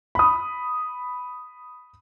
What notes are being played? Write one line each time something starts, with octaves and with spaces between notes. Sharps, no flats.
B5 D#6